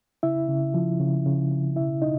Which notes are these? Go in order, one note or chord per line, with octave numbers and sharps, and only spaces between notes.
C#3 E4 E5
C#3
F3
C#3
C#3
C#3
B2 E4 E5
B2 D#4 D#5